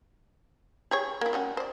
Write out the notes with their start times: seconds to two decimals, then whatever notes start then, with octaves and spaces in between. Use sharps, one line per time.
0.91 G4 G#4 C#5
1.21 A#3 E4
1.33 G3 C#4 F#4
1.57 C5 D5